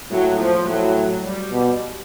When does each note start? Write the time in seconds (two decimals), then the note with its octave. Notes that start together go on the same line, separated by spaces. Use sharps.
0.11 A2 F#3
0.39 F3
0.67 A2 F#3
1.24 G3
1.52 B2